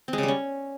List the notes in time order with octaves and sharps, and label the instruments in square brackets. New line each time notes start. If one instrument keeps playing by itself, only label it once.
[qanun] C4
G#3
C#3
G3
C#4